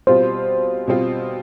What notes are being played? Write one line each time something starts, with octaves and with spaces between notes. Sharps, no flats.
B2 G3 C4 F4 C5
B2 G3 C4 F4